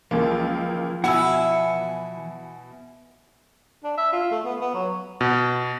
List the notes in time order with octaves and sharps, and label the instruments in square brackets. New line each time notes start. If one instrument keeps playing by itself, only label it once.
[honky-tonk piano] C#2 A#3 [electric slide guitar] E3 F3
[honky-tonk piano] B2 G#5 [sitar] E4 [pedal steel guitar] F#5 E6
[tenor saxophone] D4
E5
F4
A3
B3
B3
F#3
[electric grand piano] B2